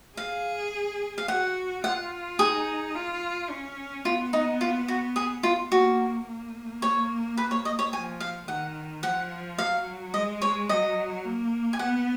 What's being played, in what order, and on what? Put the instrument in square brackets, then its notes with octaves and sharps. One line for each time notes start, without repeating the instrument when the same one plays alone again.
[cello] G#4 [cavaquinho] F5
[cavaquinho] F5
[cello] F#4 [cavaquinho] F#5
[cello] F4 [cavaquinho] F#5
[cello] D#4 [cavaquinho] G#4
[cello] F4
C#4
[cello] B3 [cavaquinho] F4
[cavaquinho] D#4
F4
F#4
G#4
F4
[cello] A#3 [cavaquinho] F#4
[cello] A#3
[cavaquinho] C#5
B4
C#5
D#5
C#5
[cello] F3 [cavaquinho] G#5
[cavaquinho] F5
[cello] D#3 [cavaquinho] F#5
[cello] F3 [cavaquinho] F#5
[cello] F#3 [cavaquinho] F5
[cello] G#3 [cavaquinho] D#5
[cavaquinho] C#5
[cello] F#3 [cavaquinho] D#5
[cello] A#3
[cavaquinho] G#5
[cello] B3 [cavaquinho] F#5